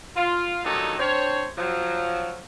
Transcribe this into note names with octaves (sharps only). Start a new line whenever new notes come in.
F4
G2 A#2 D#3 F#3 D#4 A4
C4 D4 C5 C#5
F3 F#3